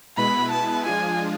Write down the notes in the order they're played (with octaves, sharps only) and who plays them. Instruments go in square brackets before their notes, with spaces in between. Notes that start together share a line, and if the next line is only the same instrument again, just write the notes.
[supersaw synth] B2 G#3 B3 E4 B4 [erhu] B5
[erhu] A5
[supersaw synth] F3 G#3 D4 F4 G#4 [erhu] G#5